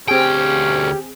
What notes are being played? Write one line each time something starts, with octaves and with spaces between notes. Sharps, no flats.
D2 C4 C#4 G4 G#4 G5